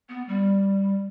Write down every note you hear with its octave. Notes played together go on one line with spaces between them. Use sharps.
B3
G3